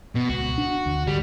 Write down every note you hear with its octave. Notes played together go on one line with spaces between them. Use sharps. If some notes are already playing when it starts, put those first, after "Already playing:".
B2
C#2 F#4
D4
D2
G#1 D2 D3 G3